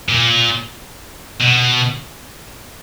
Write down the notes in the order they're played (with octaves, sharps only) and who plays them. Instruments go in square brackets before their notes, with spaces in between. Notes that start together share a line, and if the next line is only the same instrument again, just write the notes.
[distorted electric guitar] A#2
B2